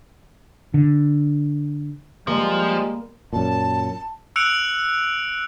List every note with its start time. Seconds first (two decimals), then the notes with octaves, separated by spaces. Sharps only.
0.74 D3
2.27 F3 G3 G#3 A#3
3.33 F#2 A#2 A5
4.36 E6 F#6 C#7 D7 F7